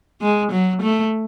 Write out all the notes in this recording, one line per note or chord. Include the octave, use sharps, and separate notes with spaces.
G#3
F#3
A3